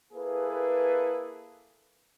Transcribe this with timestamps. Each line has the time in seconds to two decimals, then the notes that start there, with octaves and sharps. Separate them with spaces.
0.13 A#3 E4 G#4 A4 B4